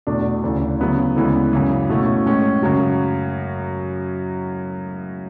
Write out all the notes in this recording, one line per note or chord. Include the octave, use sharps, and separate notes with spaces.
E2 B2 A3 D4
D2 C#3 E3
C#3 F#3 B3 E4
D2 C#3 E3 G#3 B3
F#2 C#3 E3
B2 A3 C#4 E4
A2 G#3 C#4
F#2 C#3 F#3